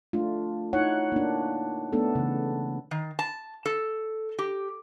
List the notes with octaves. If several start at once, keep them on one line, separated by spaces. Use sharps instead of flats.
A3 D4 F4
D#4 E4 C#5 F#5
A#3 D4
A3 B3 D4 A4
C#3 E3
D#3
A5
A4
G4